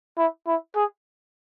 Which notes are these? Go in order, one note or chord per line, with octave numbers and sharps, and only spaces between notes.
E4
E4
G#4